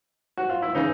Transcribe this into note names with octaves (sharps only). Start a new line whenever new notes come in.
F#4
F4
E4
C#3 E3 D#4